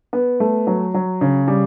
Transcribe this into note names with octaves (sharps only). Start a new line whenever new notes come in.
B3
A3
F#3
F#3
C#3
G3